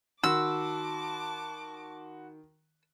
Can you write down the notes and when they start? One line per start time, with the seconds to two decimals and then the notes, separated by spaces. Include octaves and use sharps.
0.24 D#3 F#4 A5 B5 C6 D6 E6